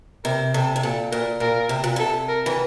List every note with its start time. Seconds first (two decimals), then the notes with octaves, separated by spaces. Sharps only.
0.24 C3 A#4
0.54 C3 A4
0.76 C3
0.82 A#2 A4
1.12 A#2 A#4
1.40 A#2 A#4
1.69 C3
1.84 A#2
1.96 C3 A4
2.28 A#4
2.46 E3